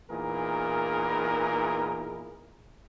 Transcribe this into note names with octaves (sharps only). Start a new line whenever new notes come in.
E2 A#2 D#4 E4 G#4 A#4